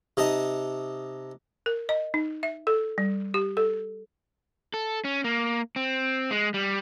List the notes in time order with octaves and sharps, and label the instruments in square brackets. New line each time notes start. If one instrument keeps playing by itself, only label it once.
[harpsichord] C3 D#4 D#5 A5 D#6
[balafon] A#4
D#5
D#4
E5
A4
G3
G4
A4
[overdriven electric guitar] A4
C#4
A#3
C4
G#3
G3